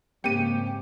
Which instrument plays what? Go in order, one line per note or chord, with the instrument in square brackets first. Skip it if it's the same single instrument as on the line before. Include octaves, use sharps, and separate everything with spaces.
[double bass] G#2 C#3 [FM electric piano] A#3 C4 C#7 [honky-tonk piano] G4 D#7